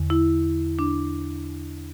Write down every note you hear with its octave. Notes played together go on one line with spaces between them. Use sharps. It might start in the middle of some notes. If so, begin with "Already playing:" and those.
Already playing: E2 D3
E4
D4